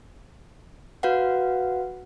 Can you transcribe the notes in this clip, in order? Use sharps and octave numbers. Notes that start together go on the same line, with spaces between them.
F#4 B4 F5 F#5